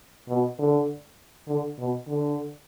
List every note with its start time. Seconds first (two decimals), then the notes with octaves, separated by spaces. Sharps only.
0.28 B2
0.59 D3
1.47 D3
1.78 B2
2.08 D3